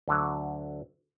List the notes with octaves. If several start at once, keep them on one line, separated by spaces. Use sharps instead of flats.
D2 D3 F#3